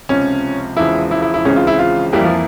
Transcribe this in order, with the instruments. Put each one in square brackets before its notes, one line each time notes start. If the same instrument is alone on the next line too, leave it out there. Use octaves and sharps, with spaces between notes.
[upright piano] C#2 C3 F3 [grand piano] C#4
[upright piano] E1 E2 C#3 F3 G#3 [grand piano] E4
[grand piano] E4
E4
E4
[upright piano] C#2 C#3 E3 G#3 C4 [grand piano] C#4
[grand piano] F4
E4
F4
[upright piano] F2 E3 A#3 E4 [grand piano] G3
[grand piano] F3